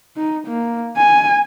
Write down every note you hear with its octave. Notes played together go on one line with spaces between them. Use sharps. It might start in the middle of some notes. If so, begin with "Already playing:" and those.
D#4
A#3
G#5